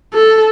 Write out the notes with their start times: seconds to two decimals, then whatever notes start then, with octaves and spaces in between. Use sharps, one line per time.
0.13 A4